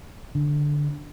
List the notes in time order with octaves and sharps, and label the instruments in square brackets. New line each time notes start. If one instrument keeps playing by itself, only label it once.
[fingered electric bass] D3